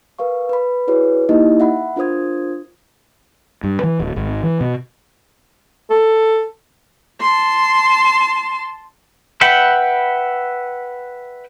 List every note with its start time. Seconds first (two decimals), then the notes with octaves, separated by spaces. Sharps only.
0.19 A#4 B4 F5 C#6
0.49 B4 B5
0.87 E4 F#4 G#4 B4 C#5 D5
1.29 A#3 D#4 E4 G4 D#5
1.60 E5 F#5 B5
1.96 D4 F4 A#4 C5 D#6 G#6
3.64 G2
3.83 E3
4.00 D1
4.16 G#1
4.43 E3
4.61 B2
5.90 A4
7.21 A5 C6
9.41 B4 E5 F#5 G5 B5